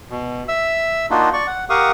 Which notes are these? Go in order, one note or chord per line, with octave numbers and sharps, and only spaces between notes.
B2
E5 E6
A#3 D4 D#4 F4 F#4
D5 C#6
F#5
G4 A#4 F5 F#5 C#6 D#6